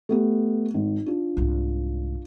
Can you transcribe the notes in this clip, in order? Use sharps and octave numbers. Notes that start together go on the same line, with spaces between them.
A3 B3 G4
G#1
D4 F4
C2 G#2